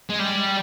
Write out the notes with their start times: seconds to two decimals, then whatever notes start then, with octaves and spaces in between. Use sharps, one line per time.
0.09 G#3
0.19 G3